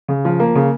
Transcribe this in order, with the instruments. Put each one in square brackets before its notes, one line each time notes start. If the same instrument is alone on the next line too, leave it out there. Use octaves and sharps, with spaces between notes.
[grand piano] C#3
F3
A#3
C#3